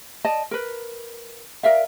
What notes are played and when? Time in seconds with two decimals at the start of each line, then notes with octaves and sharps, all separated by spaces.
0.25 D5 D#5 A5
0.51 A#4 B4
1.63 A#4 D5 E5 F5